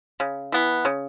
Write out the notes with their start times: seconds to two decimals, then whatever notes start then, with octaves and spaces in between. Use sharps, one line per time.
0.20 C#3
0.52 E3 B3
0.85 C#3